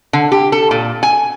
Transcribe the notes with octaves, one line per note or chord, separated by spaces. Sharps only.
D3
G4
A4
A#2
G#5